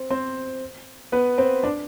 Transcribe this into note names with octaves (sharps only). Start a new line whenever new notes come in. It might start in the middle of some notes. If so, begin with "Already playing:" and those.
Already playing: C4
C4 C5
B3 B4
C4 C5
D4 D5